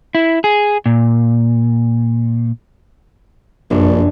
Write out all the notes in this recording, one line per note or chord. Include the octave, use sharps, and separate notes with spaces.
E4
G#4
A#2
F1 A#1 F#2 D4